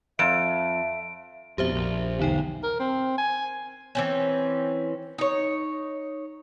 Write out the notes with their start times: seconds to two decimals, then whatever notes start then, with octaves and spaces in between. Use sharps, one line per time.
0.19 F2 E5 D7
1.58 F2 G#2 B2 G4 C5 E5
1.72 A#1
2.20 B1 E2 D3 D#4 G5
2.63 A#4
2.80 C4
3.18 G#5
3.95 E3 C4 C#4
5.18 D#4 C#5